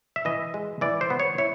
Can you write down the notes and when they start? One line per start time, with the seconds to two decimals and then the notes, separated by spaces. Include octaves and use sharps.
0.16 E5
0.25 E3 D#5
0.54 G#3
0.81 E3 D5
1.01 C5
1.10 B3
1.20 C#5
1.38 E4 C#5